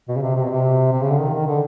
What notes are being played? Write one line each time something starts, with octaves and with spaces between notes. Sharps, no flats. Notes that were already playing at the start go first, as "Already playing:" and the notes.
B2
C#3
C3
C3
B2
C3
C3
C#3
D3
D#3
D#3
D3